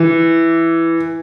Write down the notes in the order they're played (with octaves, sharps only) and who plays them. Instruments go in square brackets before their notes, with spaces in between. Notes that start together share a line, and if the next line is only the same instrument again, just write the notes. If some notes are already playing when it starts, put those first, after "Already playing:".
Already playing: [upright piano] E3